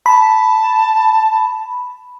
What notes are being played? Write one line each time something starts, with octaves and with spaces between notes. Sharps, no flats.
A5 B5